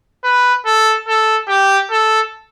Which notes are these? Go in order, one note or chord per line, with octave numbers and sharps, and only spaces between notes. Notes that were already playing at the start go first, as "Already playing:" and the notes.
B4
A4
A4
G4
A4